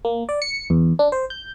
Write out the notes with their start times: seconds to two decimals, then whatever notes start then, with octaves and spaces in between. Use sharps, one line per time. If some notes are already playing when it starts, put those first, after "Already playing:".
0.05 A#3
0.29 D5
0.42 C#7
0.70 E2
0.99 D4
1.12 C5
1.30 G6